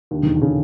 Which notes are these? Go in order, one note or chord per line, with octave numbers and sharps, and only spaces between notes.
D#2 D3
E1 D#3
D3
C#3